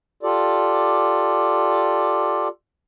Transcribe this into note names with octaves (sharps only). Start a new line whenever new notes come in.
F4 G4 A4 D5